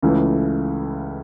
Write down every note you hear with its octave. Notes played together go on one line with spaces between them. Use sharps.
C#2 C#3 E3 A3